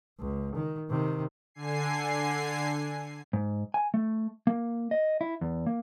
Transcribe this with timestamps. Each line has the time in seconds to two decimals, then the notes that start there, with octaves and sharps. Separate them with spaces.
0.20 C#2
0.55 D#3
0.90 C3 D#3
1.54 D3 G#5 C7
3.33 G#2
3.74 G#5
3.94 A3
4.47 A#3
4.91 D#5
5.21 E4
5.41 E2
5.67 A#3